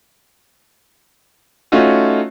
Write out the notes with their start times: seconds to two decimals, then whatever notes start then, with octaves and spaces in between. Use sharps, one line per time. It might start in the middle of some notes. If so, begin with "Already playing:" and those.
1.72 A3 C#4 D#4 F4 F#4